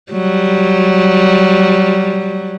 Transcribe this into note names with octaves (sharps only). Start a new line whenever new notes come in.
F#3 G3